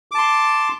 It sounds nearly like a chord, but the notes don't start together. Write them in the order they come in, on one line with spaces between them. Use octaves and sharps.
D6 A5 C6